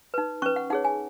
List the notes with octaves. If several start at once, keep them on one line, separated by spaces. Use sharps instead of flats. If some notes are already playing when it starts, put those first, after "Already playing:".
D#4 B4
C#4 B4 C#6
F#5
D#4 G#4 C#5 F#5
G#5